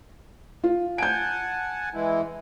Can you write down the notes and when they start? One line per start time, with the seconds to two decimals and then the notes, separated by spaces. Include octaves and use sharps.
0.64 F4
0.98 F#5 G#5 A5 G6 D7
1.94 E3 G#3 E4